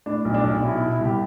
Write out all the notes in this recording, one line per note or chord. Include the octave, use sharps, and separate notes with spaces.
A2 D4
B1
D4
B1
B2 E4
E4
B2
E4
C2 G4